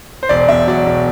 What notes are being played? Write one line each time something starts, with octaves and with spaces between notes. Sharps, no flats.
C5
E1 D5
E1 E5
F#3 D5
E1